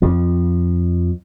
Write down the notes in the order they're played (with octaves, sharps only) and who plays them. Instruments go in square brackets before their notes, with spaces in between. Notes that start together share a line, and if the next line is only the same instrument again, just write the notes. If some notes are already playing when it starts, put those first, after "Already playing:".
[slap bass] F2 F3